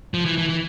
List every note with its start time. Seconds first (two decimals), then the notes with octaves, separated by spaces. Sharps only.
0.14 F3
0.25 E3
0.38 E3
0.49 E3